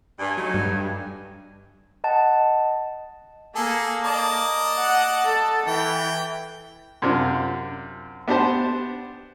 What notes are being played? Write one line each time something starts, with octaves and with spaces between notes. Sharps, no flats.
G2 G#5
F#3 A3 D4 D#4
G2
D#5 F#5 A5
A#3 G#4 A4
D5 D#5 A5
F#5
A4
E3 G5
F#2 C3 D4 F4
B3 D4 G4 C5 A5